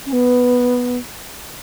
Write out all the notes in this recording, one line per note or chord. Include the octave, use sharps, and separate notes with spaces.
C#4
B3